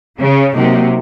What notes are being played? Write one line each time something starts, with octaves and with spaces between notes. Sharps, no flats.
C#3
C3 F#3 A#3 D#4